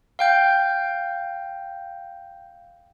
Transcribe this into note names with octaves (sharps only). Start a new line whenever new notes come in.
F5 G5 G6